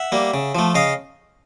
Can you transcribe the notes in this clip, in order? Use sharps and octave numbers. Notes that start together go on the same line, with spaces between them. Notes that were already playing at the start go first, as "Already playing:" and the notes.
Already playing: E5 F#5
G3 A#3
C#3
F3 A3
C#3 D#5 F5